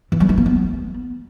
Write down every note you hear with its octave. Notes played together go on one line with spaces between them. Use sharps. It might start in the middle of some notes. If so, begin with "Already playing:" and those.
E3
G3
G#3
A#3
B3